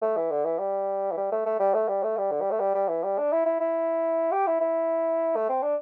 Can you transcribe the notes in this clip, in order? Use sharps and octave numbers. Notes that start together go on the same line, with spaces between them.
A3
E3
D3
E3
G3
E3
G3
A3
A3
G3
A3
G3
A3
G3
D3
G3
A3
G3
G3
E3
G3
D4
E4
E4
E4
G4
E4
E4
A3
C4
D4